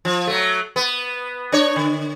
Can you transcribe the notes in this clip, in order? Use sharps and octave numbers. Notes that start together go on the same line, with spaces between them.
F3
F#3 A3
B3
D4 C#5
D3